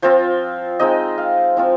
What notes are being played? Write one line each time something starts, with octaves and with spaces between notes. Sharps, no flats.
F3 C4 F4 C5
G#3 C4 D#4 D#5
F5
F3 C4 F4